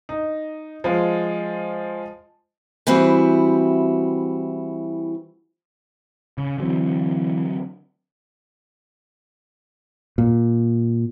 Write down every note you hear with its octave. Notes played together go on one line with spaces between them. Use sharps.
D#4
F3 G#3 F4
E3 G3 C4 E4 F#4
C#3
D3 E3 F#3 C4
A#2